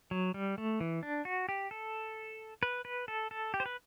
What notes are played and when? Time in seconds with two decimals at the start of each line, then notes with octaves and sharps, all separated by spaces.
0.11 F#3
0.34 G3
0.58 A3
0.80 E3
1.03 D4
1.25 F#4
1.49 G4
1.71 A4
2.63 B4
2.85 B4
3.08 A4
3.31 A4
3.54 G4
3.60 C5
3.66 B4